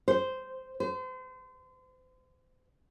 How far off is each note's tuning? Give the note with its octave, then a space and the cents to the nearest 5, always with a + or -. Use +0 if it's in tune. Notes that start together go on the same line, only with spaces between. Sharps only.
C5 -10
C5 -35